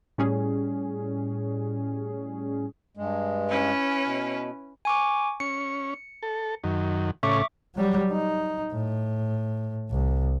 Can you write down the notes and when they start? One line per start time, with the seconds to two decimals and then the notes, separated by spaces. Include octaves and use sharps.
0.18 A2 G3 C#4 G#4
2.97 G2 G#3
3.48 C#4 E4 B4
4.05 B2
4.85 G#5 C#6 D6
5.40 C#4 C#7
6.23 A4
6.64 F#2 D#3
7.23 A2 C#3 C#4 E5 C#6 D6
7.75 F#3 G3
8.11 D#4
8.73 A2
9.91 C2